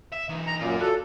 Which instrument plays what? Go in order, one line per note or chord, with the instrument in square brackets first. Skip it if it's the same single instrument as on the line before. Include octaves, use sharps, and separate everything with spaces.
[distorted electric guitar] E5
E3 D#4
[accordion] A#5
[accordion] F#2 A#2 [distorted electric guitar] F4 D5
[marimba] F#4 [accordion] A4